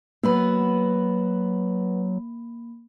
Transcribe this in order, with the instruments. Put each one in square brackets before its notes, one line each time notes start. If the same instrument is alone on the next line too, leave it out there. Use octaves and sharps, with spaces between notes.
[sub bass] F#3 [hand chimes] A#3 B5 [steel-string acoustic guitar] B3 F#4 B4